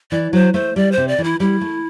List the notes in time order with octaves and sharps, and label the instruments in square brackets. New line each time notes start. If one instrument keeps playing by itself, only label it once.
[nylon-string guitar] E3 [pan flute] D5
[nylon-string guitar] F#3 [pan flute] C5
[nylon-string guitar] A3 [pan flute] C5
[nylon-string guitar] G3 [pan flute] D5
[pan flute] C5
[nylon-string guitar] C3
[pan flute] D5
[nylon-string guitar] E3
[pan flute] E4
[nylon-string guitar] G3 [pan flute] E4
[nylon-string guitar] A3